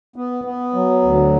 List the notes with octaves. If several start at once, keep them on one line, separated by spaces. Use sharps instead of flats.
B3
B3
F#3
D2